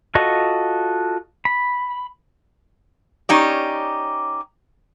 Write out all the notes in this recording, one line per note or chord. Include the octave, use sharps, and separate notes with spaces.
F4 F#4 A4 D#5 C#6
B5
C#4 D#4 G4 D5